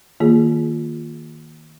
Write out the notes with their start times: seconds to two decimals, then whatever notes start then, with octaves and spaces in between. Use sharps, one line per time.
0.20 D#3 A#3 F4 G#4